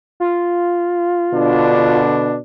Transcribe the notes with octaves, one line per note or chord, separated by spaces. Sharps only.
F4
B2 D3 D4